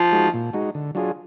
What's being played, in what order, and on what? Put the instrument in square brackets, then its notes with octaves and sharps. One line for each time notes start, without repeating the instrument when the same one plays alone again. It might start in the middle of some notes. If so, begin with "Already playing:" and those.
Already playing: [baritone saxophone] F3
[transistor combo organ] G#3 D#4 F#4
A#2
G#3 D#4 F#4
D3
F#3 D4 F4 G#4